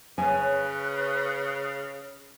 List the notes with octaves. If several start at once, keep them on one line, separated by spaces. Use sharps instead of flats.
C#3 C#4 B4 D#5 F5 G#5